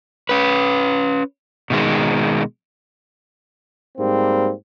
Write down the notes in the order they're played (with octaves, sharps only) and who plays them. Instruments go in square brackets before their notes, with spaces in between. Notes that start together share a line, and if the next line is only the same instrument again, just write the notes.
[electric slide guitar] C#4 B4
B2 D#3 G#3
[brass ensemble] G#2 G3 A#3 C4